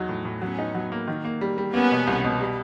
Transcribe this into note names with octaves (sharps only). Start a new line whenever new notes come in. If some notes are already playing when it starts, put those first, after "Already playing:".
Already playing: E2 F#3 D#4
A2
A2
F#3 B3 C#4
D#4
F#3
A#3
D#3
A#3
G3
G3
A#3 B3 C#4
B2
C2
B2
G3